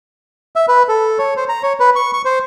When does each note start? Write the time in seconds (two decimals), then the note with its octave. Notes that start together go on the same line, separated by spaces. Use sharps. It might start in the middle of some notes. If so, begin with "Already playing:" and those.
0.56 E5
0.68 B4
0.88 A4
1.19 C#5
1.37 C5
1.49 A#5
1.63 C#5
1.80 B4
1.96 C#6
2.13 C#6
2.25 C5